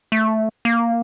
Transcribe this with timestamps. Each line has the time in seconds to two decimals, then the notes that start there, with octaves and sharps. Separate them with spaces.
0.12 A3
0.65 A#3